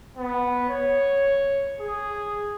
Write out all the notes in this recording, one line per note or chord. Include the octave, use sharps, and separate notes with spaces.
B3
C#5
G#4